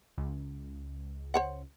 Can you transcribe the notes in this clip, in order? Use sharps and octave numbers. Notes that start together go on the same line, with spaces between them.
C#2
C5 C#5 F#5